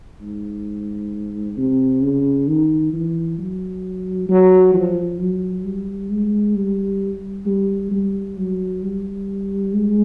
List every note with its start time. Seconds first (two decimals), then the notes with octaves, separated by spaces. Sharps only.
0.21 G#2
1.57 C3
2.02 C#3
2.48 D#3
2.93 E3
3.38 F#3
4.29 F#3
4.74 F3
5.19 F#3
5.64 G3
6.10 G#3
6.55 G3
7.46 G3
7.91 G3
8.37 F#3
8.83 G3
9.73 G#3